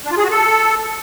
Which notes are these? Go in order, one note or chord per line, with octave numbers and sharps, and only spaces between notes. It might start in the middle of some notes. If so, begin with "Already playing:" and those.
D4
F4
G#4
F#4
A4